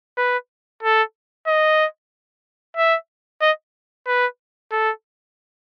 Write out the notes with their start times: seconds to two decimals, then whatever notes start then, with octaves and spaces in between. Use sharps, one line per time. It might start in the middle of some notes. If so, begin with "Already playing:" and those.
0.18 B4
0.83 A4
1.47 D#5
2.77 E5
3.41 D#5
4.07 B4
4.72 A4